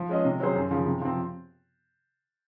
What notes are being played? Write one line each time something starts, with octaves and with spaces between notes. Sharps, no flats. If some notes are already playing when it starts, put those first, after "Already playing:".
Already playing: F3
G#3 C#4 G#4 D#5
C3
F#3 C#4 G#4 C5
F#2
C#3 F3
C3
F3 C4